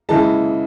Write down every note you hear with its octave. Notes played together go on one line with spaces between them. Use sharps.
C#3 E3 G#3 A5